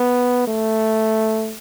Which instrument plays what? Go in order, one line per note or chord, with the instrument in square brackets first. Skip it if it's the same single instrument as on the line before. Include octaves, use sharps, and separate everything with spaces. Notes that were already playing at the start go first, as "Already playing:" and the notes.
Already playing: [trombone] B3
A3